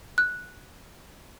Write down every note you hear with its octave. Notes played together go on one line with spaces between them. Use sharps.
F#6